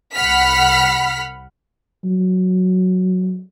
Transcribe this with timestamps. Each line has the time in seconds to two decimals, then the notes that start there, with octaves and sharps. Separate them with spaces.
0.14 C2 F#5 B5 F6 B6
2.04 F#3